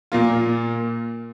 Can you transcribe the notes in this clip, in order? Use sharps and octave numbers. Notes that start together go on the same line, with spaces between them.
A#2 A#3 F4